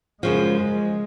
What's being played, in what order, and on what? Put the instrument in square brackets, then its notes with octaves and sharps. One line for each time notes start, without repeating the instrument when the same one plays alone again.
[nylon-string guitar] F#2 C#3 F3 [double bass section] G#3